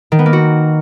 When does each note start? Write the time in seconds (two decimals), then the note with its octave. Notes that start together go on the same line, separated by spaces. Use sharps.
0.12 D#3
0.19 B3
0.26 A#3
0.33 F#4